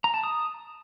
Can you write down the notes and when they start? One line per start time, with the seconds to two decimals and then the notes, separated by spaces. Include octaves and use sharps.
0.04 A#5
0.14 A5
0.24 D#6